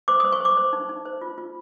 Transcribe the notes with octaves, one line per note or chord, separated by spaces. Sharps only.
C5 D6
D#6
C5
C#6
C5 D6
C5
D#4
D#4
C5
F4
F4